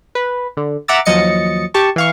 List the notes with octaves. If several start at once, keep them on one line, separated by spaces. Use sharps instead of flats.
B4
D3
E5 F#5 A#5 D6 E6 A6
D#2 F3 F#3 D#5 A6 C#7
G4 A5 C#6
E3 F5 C#6